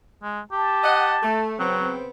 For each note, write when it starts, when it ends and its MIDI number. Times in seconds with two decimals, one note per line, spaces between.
0.23 0.40 56
0.52 1.24 67
0.52 1.49 81
0.84 1.15 75
0.84 1.15 78
1.22 1.54 57
1.59 2.09 49
1.59 1.92 54
1.59 2.09 59
1.59 2.09 60